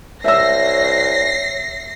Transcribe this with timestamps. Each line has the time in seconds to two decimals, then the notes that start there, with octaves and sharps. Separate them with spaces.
0.24 C2 C#5 E5 E6 A#6 C7